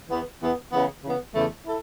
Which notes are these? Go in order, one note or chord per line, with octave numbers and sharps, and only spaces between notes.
E2 E3 B3
E2 E3 B3
C#3 E3 B3
C#3 E3 B3
E2 C#3 A3 E4 A4
E4 A4